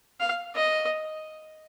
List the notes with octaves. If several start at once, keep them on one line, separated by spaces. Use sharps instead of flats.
F5
D#5